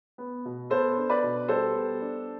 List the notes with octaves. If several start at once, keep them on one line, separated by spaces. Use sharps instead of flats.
B3
B2
B3 A4 C5
D4
B4 D5
B2
G3 A4 C5
B3
D4